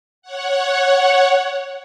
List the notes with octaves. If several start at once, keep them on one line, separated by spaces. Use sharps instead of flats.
C#5 F#5